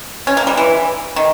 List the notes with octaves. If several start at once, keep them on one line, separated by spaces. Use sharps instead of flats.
C#4
A#3
G3
E3
D#3